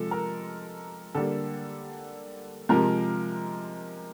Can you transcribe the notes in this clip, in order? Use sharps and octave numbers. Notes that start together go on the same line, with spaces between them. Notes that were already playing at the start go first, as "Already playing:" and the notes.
Already playing: C3 F3 G#3 A4
A#4
D3 G3 A#3 A4
C3 F3 G#3 A#4